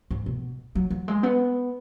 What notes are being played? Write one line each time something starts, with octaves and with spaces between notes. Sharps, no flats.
G#2
B2
F#3
F#3
G#3
B3